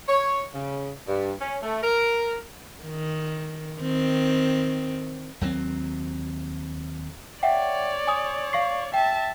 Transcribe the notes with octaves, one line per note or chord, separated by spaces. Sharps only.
C#5
C#3
G2
C#4
A3
A#4
D#3
D#3 C4
D#2 F#3 G#3 C4
C#5 D5 E5 F#5 G5
G#5 D#6
F5 C#6 C7
E5 G5 A5